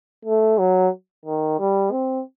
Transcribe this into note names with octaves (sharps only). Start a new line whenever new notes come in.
A3
F#3
D#3
G3
C4